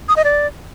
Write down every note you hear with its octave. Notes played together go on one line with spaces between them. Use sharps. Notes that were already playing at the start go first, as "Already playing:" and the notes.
D#6
D#5
D5